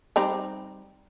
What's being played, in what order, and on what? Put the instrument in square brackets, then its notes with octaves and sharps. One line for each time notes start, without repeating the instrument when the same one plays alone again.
[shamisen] G3 C4 D#4